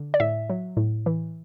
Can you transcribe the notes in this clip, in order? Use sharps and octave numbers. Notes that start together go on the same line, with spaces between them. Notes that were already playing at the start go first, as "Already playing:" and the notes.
Already playing: D3
D5
A2 E5
F#3
A2
E3